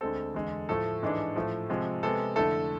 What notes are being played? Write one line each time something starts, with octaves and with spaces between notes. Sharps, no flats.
D2 D3 G#3 C4 A4
E2 D3 G#3
A2 F3 A3 A4
G#2 E3 G#3 D4
A2 F3 A3
C3 F3 G#3 C4
C3 G#3 B3 A4
F2 D3 A3 E4 A4